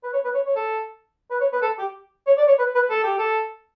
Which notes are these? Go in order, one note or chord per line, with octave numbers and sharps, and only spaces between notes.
B4
C#5
B4
C#5
C#5
A4
B4
C#5
B4
A4
G4
C#5
D5
C#5
B4
B4
A4
G4
A4